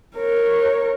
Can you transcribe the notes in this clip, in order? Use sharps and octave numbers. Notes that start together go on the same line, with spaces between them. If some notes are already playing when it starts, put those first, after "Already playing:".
A#4 C#5